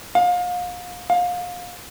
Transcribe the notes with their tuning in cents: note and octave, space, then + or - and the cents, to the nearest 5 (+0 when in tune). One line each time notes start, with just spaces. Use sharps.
F5 +35
F5 +30